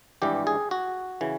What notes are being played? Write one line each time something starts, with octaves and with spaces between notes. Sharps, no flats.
G#1 G2 E3 G3 G4
G#4
F#4
C#3 E3